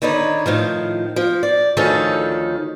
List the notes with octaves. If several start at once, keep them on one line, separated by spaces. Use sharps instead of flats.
D3 D#3 D#4 B4 C#5
A2 D#3 F3
F3
D5
D2 D#3 F3 C#4 A4